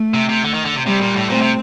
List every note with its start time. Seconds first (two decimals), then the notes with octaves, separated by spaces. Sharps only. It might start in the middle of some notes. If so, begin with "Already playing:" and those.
Already playing: A3
0.14 C3
0.29 C3
0.43 D3
0.54 D#3
0.65 D3
0.76 C3
0.86 C3 G3
1.01 A#2
1.16 A2
1.29 A#2 A3 C4
1.41 C3